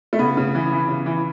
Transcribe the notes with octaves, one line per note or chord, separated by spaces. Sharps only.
A3
C#3 B3
C#3
E3
E3
C#3
E3